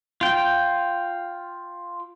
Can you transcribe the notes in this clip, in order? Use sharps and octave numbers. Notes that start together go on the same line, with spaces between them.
F4 G5